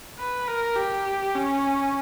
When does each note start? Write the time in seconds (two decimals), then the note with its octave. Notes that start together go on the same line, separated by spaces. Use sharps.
0.19 B4
0.48 A#4
0.76 G4
1.35 C#4